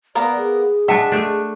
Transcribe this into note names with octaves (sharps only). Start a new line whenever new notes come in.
A#3 B3 A#4 D5
G#4
G#3 D4 E5 F#5 G5 A5
A3 D4